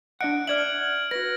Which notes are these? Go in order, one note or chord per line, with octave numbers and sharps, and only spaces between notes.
D4 D#5 F#5 F#6 C#7 D7
D5 E5 F6 G#6 F#7
F#4 B4 A#6